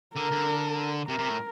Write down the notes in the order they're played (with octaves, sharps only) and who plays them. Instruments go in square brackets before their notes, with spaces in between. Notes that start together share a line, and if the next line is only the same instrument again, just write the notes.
[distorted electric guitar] D3 [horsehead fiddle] A#4
[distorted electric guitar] D3
[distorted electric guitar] C3 [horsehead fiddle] A#4
[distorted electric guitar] C3
A2